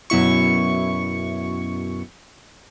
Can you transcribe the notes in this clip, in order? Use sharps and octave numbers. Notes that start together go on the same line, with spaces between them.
F#2 B2 E4 C#6